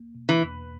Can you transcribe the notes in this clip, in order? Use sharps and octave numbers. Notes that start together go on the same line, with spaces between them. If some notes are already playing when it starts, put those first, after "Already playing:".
Already playing: A#3
B2
E3
E2